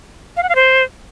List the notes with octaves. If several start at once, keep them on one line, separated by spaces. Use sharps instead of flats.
F5
F#5
F5
C5